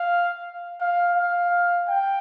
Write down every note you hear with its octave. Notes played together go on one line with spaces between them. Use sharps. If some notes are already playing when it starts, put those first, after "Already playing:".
Already playing: F5
F5
F5
G5